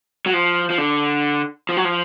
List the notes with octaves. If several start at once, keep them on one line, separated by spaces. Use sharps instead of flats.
F#3
F3
F3
D3
F3
F#3
F3